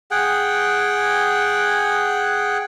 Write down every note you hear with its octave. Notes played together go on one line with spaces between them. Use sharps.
G#4 F#5 G5